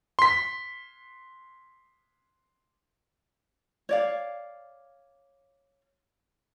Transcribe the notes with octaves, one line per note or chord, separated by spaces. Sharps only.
C6 B6
C#5 D5 F5